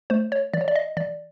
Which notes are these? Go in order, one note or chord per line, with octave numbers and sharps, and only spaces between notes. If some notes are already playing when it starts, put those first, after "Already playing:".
A3 C5
C#5
E3 D5
C#5
D5
D#5
E3 D5